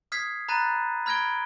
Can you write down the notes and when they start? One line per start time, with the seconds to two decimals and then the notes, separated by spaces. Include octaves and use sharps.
0.12 D#6 F6 G#6 B6 C7
0.49 A#5 B5 F#6 A6 D#7
1.06 B5 F6 G#6 A#6 D7 G7